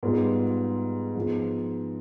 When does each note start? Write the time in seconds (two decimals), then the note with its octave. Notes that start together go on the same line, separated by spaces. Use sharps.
0.03 G#2 G3 B3 F4
1.15 G#2 F3 B3